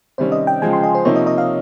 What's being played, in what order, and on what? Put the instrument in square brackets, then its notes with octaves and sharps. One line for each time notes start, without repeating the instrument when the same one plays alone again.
[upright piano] C3 D#3 G3 C#4 [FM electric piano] C5
[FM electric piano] D#5
G5
[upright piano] C#3 F3 G#3 [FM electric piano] G#5
[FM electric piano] C6
D#5
C5
[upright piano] C3 F3 A#3 D#4 [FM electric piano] C#5
[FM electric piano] D#5
D#5
F5